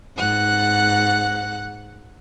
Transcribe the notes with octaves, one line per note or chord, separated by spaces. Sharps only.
G#2 F#5 F#6